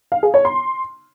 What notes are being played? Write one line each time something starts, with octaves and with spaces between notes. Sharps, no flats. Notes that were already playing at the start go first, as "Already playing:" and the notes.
F5
G#4
C#5
C6